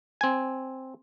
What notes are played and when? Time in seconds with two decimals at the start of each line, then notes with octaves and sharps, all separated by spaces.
0.21 C4 G#5